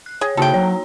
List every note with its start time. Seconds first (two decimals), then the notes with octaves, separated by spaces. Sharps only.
0.06 F#6
0.21 G#4 C#5
0.37 C#3 A#3 D#4 F#4 A4 G5
0.54 F#3 C#5 A#5